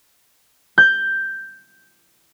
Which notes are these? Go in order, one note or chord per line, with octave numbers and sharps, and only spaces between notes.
G6